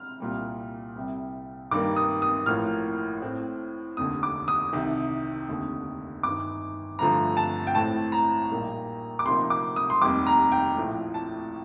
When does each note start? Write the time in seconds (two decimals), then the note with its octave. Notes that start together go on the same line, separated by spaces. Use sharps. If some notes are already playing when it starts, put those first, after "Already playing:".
Already playing: F6
0.20 C2 A#2 G3
0.96 C2 C3 G3
1.71 G2 D#3 G3 A#3 D6
1.97 D#6
2.22 D#6
2.46 A1 A2 F3 A#3 F6
3.22 A2 A3 C4
3.97 F1 D#2 D3 D#6
4.23 D6
4.48 D#6
4.73 C2 C3 D#3
5.48 F1 D#2 D3
6.23 G1 G2 D#3 D6
6.99 G1 G2 D3 F3 A3 A#5
7.37 A5
7.67 G5
7.75 A1 A2 A3 C4 A5
8.12 A#5
8.51 A#1 A#2 G3 A#3 D#4
9.19 D6
9.25 D2 C3 F3 A#3 D#4 C6
9.50 D6
9.76 D#6
9.90 C6
10.01 F1 D#2 D#3 G3 D6
10.26 A#5
10.52 G5
10.77 A#1 A2 F3 A3
11.14 A5